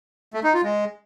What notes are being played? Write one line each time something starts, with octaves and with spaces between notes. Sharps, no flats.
A3
D#4
F4
G#3